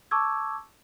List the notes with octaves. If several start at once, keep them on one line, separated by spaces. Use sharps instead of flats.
A5 C#6 D6 E6 G#6